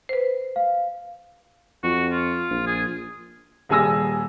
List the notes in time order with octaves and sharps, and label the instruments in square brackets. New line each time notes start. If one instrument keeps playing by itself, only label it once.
[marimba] B4 C5
[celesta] F5
[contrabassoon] F2 [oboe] F#4
[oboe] F4
[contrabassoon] A#1
[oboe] G#4
[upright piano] D#1 G3 G#4 G#5 E6 A#6